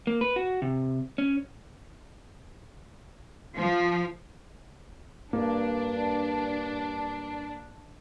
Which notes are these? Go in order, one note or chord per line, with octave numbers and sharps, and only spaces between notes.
A#3
B4
F#4
C3
C#4
F3
G2 A#3 D4